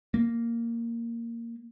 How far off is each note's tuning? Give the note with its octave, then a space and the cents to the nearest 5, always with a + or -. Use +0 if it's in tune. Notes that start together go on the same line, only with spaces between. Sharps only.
A#3 -5